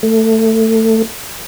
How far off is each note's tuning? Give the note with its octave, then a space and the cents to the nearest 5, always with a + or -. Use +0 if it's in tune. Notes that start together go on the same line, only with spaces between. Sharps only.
A3 +20